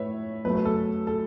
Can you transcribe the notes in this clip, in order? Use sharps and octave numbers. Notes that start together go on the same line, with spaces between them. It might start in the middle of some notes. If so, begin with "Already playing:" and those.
Already playing: A2 A3 B4 C#5 E5
F#2 F#3 A3 B4
B4
A4
A4